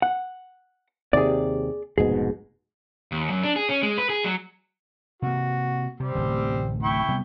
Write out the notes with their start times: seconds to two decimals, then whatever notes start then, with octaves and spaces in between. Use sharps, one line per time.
0.02 F#5
1.13 D#2 C3 G#4 D5
1.98 F1 G#2 B2 G#4
3.12 D#2
3.30 F#2
3.44 D4
3.56 G#4
3.69 C#4
3.83 G#3
3.98 B4
4.10 G#4
4.24 F#3
5.22 C3 A#3 F#4
6.00 C3 G3 C4
6.15 D1 A1 C3
6.83 E4 G5 C#6
7.08 C3 G3 B3